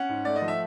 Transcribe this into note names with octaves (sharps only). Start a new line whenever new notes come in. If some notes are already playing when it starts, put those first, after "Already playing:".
Already playing: C#4 F#5
G#2
A3 D5
D#5
F3
E5